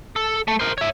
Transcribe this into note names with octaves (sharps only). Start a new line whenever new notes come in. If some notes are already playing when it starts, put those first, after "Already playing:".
A4
A3
A#4 C5
C#5 E5